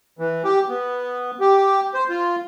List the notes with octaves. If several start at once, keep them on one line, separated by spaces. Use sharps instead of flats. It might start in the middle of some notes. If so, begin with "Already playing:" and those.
E3
G4
B3
G4
C5
F4